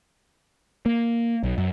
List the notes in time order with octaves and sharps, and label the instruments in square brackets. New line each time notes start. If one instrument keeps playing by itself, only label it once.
[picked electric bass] A#3
B1
F#2